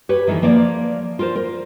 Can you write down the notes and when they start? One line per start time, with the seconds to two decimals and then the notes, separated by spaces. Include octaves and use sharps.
0.09 G4 B4 C#5
0.27 D#3 E3 A3 D#4
0.42 F3 A#3 C#5 D5
1.19 F4 A#4 C5
1.36 A#4